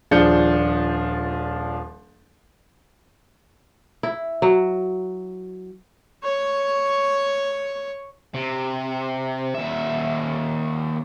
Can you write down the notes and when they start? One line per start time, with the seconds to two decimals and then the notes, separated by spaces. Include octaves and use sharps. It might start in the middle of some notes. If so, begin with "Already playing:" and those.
0.11 D#1 F3 D4 G#4 G6 C#7
4.03 E4
4.42 F#3
6.24 C#5 C#6
8.34 C3
9.54 D#2 E5